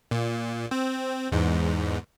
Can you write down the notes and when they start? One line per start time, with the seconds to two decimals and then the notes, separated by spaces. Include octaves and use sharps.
0.11 A#2
0.71 C4
1.32 E2 G#2